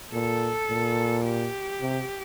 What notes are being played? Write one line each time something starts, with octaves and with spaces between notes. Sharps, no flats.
A#2 A4
A#2
G4
C3